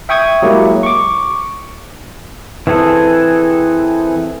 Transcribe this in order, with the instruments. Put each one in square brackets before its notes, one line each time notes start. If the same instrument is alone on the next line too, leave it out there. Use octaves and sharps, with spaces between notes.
[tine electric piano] E5 G5 C#6 D#6 G#6
F#3 G#3 A#3 E4 G4
C#6 D6
[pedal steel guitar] E3 C4 G#4 A4